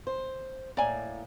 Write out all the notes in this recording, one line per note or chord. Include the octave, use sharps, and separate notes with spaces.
C5
A2 A#3 D5 G#5